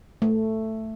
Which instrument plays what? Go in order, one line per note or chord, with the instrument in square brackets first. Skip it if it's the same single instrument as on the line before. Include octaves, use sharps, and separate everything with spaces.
[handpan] A3